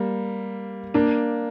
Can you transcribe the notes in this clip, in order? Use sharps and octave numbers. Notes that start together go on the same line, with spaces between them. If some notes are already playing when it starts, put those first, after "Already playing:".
Already playing: G3 A#3
A#3 D4